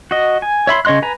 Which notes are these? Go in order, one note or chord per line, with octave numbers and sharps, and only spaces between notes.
F#4 D#5
G#5
C#5 E5 B5 C6
C#3 C#5 D#5 C6 F#6
B4 G#5 A#5